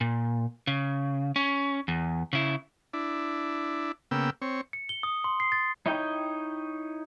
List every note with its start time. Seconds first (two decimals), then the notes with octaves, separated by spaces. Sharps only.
0.01 A#2
0.67 C#3
1.36 C#4
1.88 E2
2.33 C#3 E4
2.93 D4 E4
4.11 C#3 A#3 B3 G5 E6
4.42 C4 C#5
4.73 C#7
4.89 G7
5.03 D#6
5.24 C6
5.40 C7
5.52 A6
5.86 D#4 E4 C#5 D#5 G5